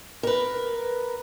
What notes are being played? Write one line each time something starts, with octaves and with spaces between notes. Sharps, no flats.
A#4 B4